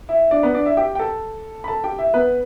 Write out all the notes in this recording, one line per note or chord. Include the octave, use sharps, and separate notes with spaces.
E4 E5
D4 D5
B3 B4
D4 D5
E4 E5
G4 G5
G5
A4 A5
B5
A4 A5
G4 G5
E4 E5
B3 B4